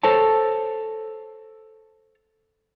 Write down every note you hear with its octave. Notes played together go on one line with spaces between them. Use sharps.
A4 C5 C#5 A5